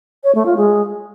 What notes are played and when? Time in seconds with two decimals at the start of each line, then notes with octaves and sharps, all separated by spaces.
0.24 C#5
0.35 A3
0.46 F4
0.56 G#3